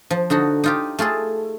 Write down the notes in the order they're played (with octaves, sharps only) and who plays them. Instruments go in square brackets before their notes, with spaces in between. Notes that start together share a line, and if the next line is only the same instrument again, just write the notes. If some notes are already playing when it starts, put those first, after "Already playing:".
[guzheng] F3
D3 D#4 F#4
D#4 F4 G4
A3 F4 G#4 A4